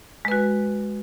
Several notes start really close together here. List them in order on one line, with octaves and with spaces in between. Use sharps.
G#3 B4 F#4